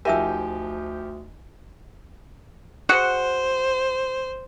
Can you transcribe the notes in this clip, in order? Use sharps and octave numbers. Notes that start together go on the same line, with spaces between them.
D2 F3 D#4 G4 A#4 E5 G#5 E6
F#4 G#4 C5 F#5